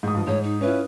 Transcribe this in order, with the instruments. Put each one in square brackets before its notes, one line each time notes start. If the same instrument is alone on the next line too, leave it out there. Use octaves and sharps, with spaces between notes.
[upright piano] G#2 D#6
G2 F3
[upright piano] G#2 [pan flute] C#5
[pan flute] D#4
[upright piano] C#4 E4 F4 [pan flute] B4